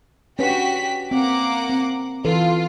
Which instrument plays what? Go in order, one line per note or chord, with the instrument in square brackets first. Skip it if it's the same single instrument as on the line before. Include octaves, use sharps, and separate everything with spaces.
[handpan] C#4 D4 B4 [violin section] F#4 G4 B6
[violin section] A#3 F#5 D6 [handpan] C4
[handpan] C4
[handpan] E3 A4 B4 [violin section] F4